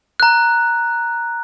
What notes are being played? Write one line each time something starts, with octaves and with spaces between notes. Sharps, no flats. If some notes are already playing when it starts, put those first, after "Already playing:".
A#5 F#6